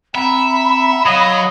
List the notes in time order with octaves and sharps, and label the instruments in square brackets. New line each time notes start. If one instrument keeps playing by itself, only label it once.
[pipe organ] C4 F#5 A#5 [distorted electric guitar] E5 [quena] B5
[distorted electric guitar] F#3 [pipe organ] C#5 F5 F#5 [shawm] D#5